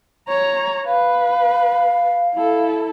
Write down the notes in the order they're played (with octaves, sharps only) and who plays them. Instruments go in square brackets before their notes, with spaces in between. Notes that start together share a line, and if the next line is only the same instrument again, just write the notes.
[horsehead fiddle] C#5 A#5
[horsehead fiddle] B4 [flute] F5
[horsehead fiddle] E4 A4